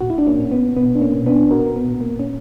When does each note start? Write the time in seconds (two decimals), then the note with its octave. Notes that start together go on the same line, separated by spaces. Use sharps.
0.01 A#2 F#4
0.10 E4
0.18 D4
0.27 A#3 C#4
0.39 A#2 C#4
0.51 B3
0.77 B2 B3
0.95 D4
1.01 A#3 C#4
1.13 B2
1.26 B3 D4
1.51 A#2 F#4 A#4
1.76 B3
1.88 A#2
2.01 A#3
2.19 C#4